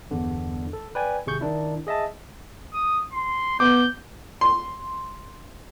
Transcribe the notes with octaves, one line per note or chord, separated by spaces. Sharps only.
G1 E2 D3
A4
B4 D5 G5 G#5
G#1 C3 G#4 C#6 G6
D#3 D4 E4
G#4 D#5 E5 A5
D#6
C6
B3 D6 G6
C6